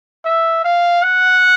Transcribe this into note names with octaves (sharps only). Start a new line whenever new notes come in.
E5
F5
F#5